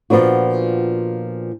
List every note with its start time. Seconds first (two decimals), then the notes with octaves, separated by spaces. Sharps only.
0.10 A#2 F3 B3 D4 F#4